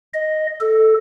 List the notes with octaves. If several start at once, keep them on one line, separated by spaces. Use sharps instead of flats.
D#5
A4